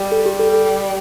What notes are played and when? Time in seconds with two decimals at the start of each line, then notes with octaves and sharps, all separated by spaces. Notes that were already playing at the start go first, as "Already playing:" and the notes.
Already playing: G3
0.12 A4
0.26 G4
0.39 A4
0.53 A4